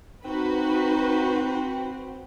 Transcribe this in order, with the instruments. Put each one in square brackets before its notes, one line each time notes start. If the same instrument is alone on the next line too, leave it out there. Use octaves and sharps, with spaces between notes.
[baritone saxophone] C4 [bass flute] D#4 [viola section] F#4 B4